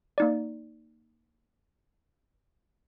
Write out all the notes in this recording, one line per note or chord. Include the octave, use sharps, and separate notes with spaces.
A#3 D#4 D5